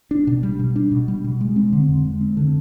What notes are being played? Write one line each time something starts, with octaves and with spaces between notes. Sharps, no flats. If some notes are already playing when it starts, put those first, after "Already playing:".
D4
B2
G3
B2
D4
B2
G3
B2
G#3
C4
D3
F2
G#3
C4
D3